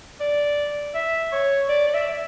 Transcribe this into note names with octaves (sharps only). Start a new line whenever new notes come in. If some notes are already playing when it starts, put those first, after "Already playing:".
D5
E5
C#5
D5
D5
E5